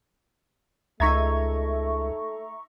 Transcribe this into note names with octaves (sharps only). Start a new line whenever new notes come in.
C#2 A3 D#4 E5 A#5 C#6 G#6